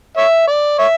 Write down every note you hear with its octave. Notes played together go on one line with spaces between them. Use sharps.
C#5 E5
D5
C#5 E5